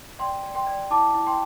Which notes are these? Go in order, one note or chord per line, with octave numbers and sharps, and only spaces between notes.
D5 G5 C6
D5
G5 C6
D5
E4 A5 D6
E4
G5 C6